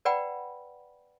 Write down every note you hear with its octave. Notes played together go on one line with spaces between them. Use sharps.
B4 D5 F#5 G5 B5